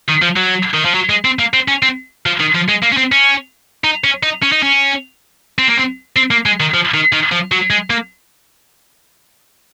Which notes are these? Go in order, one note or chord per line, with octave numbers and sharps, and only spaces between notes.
D#3
F3
F#3
D#3
F3
F#3
G#3
C4
A#3
C4
C#4
C4
F3
D#3
F3
G#3
A#3
C#4
C4
C#4
D#4
C#4
D#4
C#4
D#4
C#4
C4
A#3
C4
C4
A#3
G#3
D#3
F3
D#3
D#3
F3
F#3
G#3
A#3